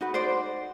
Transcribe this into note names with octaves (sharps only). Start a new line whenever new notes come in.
D#4 F#4 B4
C5 D5